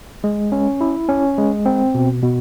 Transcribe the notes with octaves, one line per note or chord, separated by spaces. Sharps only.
G#3
C#4
E4
C#4
G#3
C4
B2
B2